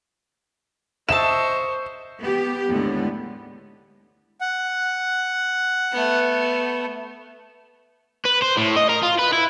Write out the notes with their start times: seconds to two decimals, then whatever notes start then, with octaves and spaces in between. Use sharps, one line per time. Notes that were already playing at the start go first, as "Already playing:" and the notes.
1.09 C5 D#5 E5 A5 C#6 E6 E7
2.19 B3 G4
2.69 D#2 A2 D3 G#3 B3
4.41 F#5
5.92 A3 B3
8.25 B4
8.42 C5
8.57 A2
8.76 D#5
8.89 A#4
9.02 F4
9.19 B4
9.33 E4